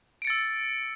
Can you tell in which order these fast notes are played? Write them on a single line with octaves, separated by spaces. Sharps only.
D7 C#7 A6 E6